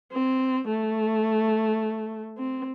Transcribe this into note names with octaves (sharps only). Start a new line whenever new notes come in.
C4
A3
C4